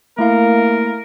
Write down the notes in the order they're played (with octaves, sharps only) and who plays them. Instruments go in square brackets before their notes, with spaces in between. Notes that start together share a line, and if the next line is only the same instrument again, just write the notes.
[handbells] A3 E4 F5 [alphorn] A#3 [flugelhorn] A#4